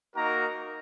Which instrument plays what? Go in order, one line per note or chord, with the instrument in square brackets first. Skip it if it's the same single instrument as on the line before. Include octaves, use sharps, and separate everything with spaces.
[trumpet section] A#3 D#4 F#4 A#4 A#5